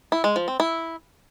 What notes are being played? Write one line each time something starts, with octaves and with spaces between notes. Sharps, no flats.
E4
G#3
F3
C4
E4